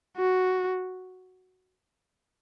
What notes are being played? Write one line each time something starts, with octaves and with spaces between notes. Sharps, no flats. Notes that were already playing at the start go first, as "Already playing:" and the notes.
F#4